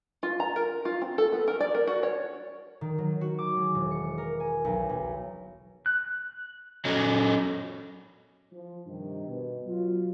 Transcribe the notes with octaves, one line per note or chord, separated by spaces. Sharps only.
F4
A#5
A#4
F4
C4
A4
B3
A#4
D5
A#4
F#4
C#5
D#3
F#3
F#4
D6
G#3
E1
C#7
A#4
G#5
B1
B1
F#6
F#3 C#4 A4 D#5
F3
G2 C3 D#3
B2
F#3 F4